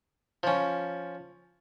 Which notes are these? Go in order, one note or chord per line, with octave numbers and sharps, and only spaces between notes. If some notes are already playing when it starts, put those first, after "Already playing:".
F3 C#4